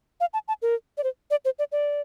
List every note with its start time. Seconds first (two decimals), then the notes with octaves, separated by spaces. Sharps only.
0.20 F5
0.33 A5
0.48 A5
0.62 A#4
0.97 D5
1.04 C5
1.31 D5
1.45 C5
1.59 D5
1.72 D5